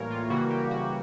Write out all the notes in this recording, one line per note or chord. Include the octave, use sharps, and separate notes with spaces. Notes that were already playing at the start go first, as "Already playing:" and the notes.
Already playing: A2 E3 G3 A#3 A#4 C#5
F4
C#3 E3 G3 A#3 F#4
G4
F#4